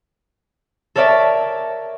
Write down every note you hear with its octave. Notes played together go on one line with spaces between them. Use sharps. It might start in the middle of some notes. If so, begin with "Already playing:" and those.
A4 A#4 C#5 D5 E5 A5